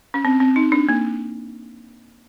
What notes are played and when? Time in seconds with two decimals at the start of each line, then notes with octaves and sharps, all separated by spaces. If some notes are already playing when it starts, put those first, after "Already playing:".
0.14 C#4
0.25 C4
0.40 C4
0.56 D#4
0.72 D4
0.89 A#3